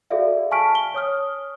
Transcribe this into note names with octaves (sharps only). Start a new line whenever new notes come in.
F#4 G#4 A4 D5 E5 F5
G#5 A5 C#6 F6 B6 D7
G7
C#5 D#6 F6